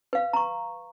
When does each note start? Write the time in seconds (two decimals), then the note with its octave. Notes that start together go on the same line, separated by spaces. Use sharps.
0.13 B4 F5
0.33 A#5 C#6